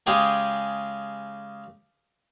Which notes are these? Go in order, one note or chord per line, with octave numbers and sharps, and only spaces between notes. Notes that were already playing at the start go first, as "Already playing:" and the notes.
C#3 G#3 G4 G#4 G5